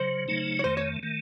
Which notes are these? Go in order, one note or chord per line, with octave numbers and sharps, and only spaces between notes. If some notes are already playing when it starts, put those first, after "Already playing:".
Already playing: C#3 F#3 C5
C#3 F#3 A3 D#4
C#5
F2 D#3 A3 C5
C#5
D#3 A3